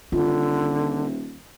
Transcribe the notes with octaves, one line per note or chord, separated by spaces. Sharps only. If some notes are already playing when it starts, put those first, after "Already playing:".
D#1 D3 F4